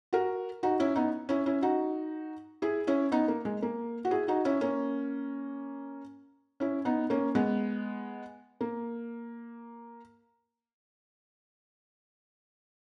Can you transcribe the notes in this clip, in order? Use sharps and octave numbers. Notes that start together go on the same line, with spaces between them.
F#4 A#4
D#4 F#4
C#4 E4
B3 D#4
C#4 E4
C#4 E4
D#4 F#4
E4 G#4
C#4 E4
B3 D#4
A#3
G#3
A#3
F#4
E4 G#4
D#4 F#4
C#4 E4
A#3 C#4
C#4 E4
B3 D#4
A#3 C#4
G#3 B3
A#3